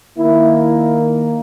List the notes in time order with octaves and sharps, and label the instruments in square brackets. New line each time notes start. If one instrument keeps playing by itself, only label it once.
[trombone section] D#3 A#3 E4